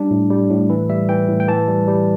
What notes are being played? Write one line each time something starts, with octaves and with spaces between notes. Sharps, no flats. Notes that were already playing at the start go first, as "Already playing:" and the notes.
Already playing: G3 D4
A2
G3
A2
E3 E4
G3 E5
E3 G5
A2
G5
E3 A5
G3
G3